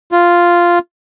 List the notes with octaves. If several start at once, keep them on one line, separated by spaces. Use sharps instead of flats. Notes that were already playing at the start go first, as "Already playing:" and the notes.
F4